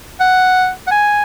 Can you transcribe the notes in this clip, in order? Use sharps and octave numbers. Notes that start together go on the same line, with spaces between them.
F#5
F#5
G#5